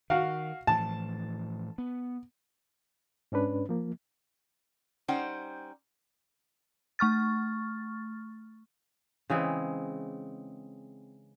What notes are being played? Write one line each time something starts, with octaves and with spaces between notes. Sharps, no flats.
D#3 F#4 F5
A2 E3 F3 A5
B3
G#2 C#4 D4 B4
F3 A#3
G3 C#4 D#4 C5 F#5 G5
A3 C#6 F6 A6
C#3 E3 G#3 C4